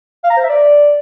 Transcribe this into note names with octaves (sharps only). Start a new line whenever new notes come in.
F5
A#5
C5
E5
D5